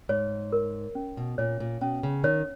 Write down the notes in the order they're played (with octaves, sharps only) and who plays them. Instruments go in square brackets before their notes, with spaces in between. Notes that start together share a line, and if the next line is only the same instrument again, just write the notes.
[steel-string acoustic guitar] G#2 [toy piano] C#5
[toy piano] A#4
C#4
[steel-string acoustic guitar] B2
[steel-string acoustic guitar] A#2 [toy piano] C#5
[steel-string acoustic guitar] A#2
[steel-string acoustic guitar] B2 [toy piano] C#4
[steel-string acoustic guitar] C#3
[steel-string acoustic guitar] D#3 [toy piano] C#5